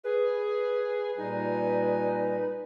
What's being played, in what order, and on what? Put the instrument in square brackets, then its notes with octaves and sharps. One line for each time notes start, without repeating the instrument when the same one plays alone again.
[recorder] G#4 [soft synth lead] B4
[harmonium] A#2 G3 G#5 [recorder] D#4